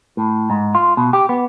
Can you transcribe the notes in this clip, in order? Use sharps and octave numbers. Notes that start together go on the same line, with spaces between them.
A2
G#2
F4
B2
G4
B3